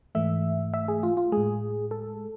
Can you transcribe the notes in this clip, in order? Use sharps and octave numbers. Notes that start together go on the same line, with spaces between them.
G#2 E3 A3 E5
E5
G#4
F4
F4
A2 G#3 G#4
A4